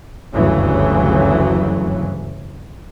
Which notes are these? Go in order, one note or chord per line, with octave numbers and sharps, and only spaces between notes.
F#1 D2 G2 C#3 E3 F#3